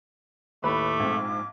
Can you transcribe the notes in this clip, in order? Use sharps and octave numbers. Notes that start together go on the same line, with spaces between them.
D#2 A2 A3 B4 B5 D6
A#1 G#2 C4